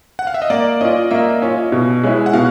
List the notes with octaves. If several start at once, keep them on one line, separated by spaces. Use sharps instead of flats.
F#5
F5
E5
D#5
A#3 D5
C#4 F4 D#5
A#3 E5
C#4 F4
B2
G#3 C#4 E4
F#5
B2 F5